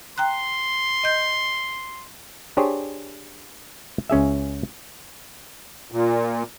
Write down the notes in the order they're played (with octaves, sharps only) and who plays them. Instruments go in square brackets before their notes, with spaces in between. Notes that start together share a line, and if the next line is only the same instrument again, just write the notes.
[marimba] G5 A#5 F#6 [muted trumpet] C6
[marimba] D#5 G6
[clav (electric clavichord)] D4 G4 G#4 C5 C#5
C#2 C#4 G#4 E5
[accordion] A#2